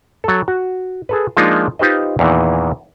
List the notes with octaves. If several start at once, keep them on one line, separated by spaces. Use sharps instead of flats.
F#3 A4
F#4
G#4 A4 B4
F3 G#3 A#3 D4 D#4 F4
D#4 F4 G4 B4 C5 D#5
E2 A#2 D#3 E3